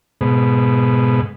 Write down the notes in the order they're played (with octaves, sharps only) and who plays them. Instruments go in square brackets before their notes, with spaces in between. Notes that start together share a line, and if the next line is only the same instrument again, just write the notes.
[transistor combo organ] G#2 B2